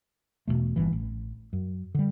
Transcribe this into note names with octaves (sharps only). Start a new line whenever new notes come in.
E1 D#2 B2 A3
G1 E3
A1
F#2
D3 G3